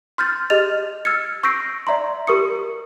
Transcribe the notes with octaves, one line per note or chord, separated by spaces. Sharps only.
C6 F6 G6 A6
G4 G#4 D#5 F6 A6 F7
E6 F6 G#6 A6 C#7
C#6 E6 G6 A#6 C7 D7
D5 E5 A#5 C6
G4 A#4 C#6 D#6 C#7